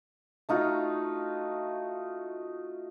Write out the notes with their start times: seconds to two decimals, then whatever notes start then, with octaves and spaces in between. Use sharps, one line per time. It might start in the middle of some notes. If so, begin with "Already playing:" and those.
0.49 A3 D#4 F4 F#4